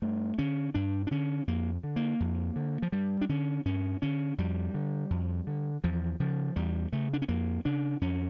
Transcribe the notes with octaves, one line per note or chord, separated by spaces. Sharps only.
G2 A3
D3 C#4
G2 D4
D4
D3 C#4
F2 A#3
D3
A#3
F2
D3
F3
G2 G3
D4
D3 C#4
G2 C#4
D3 C#4
F2 G3
D3
F2
D3
E2 F3
C#3 F3
E2 G3
C#3 A3
D4
C#4
F2 A#3
C#3 D4
F2 C#4